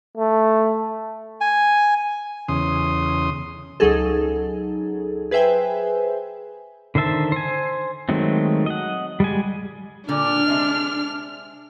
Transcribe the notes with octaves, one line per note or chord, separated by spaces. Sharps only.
A3
G#5
E2 C#3 C6 D#6
C#2 F#3 D#4 G#4 A4
G#4 B4 C5 E5 G5 G#5
D3 D#3 C5 E5 A5
C5 G#5
D#3 F#3 G#3 A3 C4
D#5 F#5
G3 G#3 G#5
A#2 D3 D4 F6
C3 G#3 E5